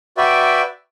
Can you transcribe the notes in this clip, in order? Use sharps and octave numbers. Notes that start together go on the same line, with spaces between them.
F#4 B4 D5 E5 G5